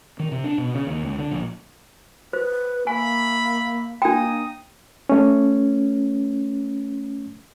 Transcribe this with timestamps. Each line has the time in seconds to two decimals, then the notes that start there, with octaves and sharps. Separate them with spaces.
0.19 D#3
0.32 C3
0.44 D4
0.58 B2
0.75 C#3
0.87 D#2
1.03 C#2
1.18 D3
1.31 A#1
2.33 B4 C5
2.87 A#3 E5 G#5 B5
4.02 A#3 D4 D#4 G5 D#6
5.09 A3 C#4